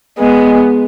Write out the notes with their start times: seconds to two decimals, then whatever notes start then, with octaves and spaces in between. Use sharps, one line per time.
0.19 G#3 B3